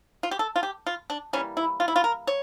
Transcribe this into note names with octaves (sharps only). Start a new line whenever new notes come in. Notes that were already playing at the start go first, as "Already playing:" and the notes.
F4
G4
A4
F4
G4
F4
D4
E3 G3 A#3 C#4
E4
F4
E4
F4
A#4
C#5